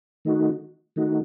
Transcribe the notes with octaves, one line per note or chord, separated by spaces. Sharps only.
D#3 A3 D#4 F#4
D#3 A3 D#4 F#4